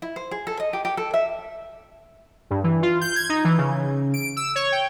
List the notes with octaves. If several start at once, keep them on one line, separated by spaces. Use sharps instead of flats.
E4
C5
G#4
A4
D#5
G4
G4
A4
E5
G2
E3
F4
G6
G#6
D#4
E3
C#3
D7
E6
C#5
G5